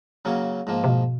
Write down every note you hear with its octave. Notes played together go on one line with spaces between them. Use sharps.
C#3 F#3 A#3 C#4
G#2 F3 A#3
C3
B2